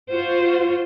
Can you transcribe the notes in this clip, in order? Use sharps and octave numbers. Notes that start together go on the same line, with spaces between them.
F4 F#4 C5